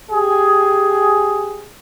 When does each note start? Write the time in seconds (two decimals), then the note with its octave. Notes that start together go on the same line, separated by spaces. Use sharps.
0.10 G4 G#4